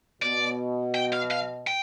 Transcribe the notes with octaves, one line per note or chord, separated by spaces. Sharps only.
B2 B3 D5
G5
F5
F5
G5